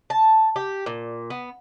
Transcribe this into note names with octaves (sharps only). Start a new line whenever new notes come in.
A5
G4
A#2
B3